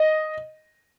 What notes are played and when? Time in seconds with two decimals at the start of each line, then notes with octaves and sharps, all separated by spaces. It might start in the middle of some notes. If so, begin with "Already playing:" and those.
Already playing: D#5